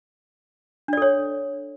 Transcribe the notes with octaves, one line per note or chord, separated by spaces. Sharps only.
D4 A4 C#5 D5